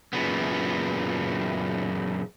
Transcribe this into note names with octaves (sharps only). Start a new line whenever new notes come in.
F#2 A#2 C#3 B3